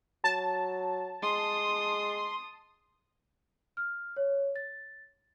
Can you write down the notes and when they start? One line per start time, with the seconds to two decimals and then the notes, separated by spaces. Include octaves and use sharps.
0.24 F#3 A5
1.23 G#3 C6 D#6
3.77 F6
4.17 C#5
4.56 A6